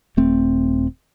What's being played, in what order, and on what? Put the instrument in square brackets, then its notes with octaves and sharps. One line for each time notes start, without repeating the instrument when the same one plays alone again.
[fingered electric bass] D#1 A3 C4